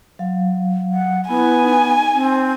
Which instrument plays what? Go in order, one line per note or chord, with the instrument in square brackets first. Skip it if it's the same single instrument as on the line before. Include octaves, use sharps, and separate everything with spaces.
[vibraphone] F#3 F5
[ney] F#5
[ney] B3 [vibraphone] E4 B5 [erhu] G#5
[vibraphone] D#4
[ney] C4